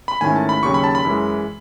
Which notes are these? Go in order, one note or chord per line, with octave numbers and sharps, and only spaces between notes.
B5
G#2 D#3 A3 C#4 E4 G#5
A5
B5
D#2 C#3 F#3 C#4 C#6
B5
A5
B5
F#2 E3 G#3